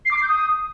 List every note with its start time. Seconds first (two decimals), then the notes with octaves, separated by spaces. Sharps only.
0.05 C7
0.11 D6
0.16 C7
0.22 G6
0.28 D#6